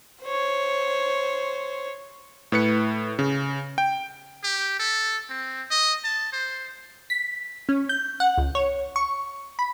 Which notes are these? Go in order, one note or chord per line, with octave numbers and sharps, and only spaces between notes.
C5 C#5
A2 B4 C#7
C#3
G5
G4
A4
C4
D#5
A5
C5
B6
C#4
G6
F#5
C#2
C#5
C#6
B5